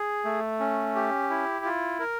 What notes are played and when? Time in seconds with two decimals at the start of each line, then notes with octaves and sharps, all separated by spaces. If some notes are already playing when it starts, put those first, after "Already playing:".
Already playing: G#4
0.25 A3
0.60 C#4
0.95 G4
1.30 E4
1.65 F4
1.99 A#4